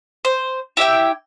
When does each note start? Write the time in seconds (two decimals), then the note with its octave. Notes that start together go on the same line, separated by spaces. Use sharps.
0.25 C5
0.77 E4 G4 E5 G5